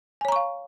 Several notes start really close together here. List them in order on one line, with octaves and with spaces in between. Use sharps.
G#5 C#5 A#5 C#6 F5